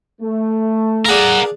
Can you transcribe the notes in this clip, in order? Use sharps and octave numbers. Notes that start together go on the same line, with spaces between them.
A3
D4 G#4 A#4 F5 F#5